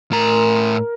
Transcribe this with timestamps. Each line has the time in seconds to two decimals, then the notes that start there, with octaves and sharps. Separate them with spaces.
0.11 A2 A#4 A#5